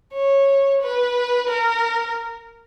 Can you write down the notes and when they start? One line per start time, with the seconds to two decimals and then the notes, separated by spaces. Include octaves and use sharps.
0.14 C#5
0.81 B4
1.49 A#4